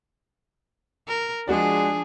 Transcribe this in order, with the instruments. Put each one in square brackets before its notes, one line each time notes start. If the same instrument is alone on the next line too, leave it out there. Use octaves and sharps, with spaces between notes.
[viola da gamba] A#4
[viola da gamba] F3 D4 G#4 [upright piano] G#3 F#4 D5